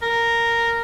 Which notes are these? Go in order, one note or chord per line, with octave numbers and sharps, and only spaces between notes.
A#4